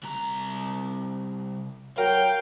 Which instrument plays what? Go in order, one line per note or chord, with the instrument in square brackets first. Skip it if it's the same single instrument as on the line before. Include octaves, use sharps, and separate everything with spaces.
[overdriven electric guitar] C2 A#5
[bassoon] F#3 [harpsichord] A#4 [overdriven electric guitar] F5 [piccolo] G5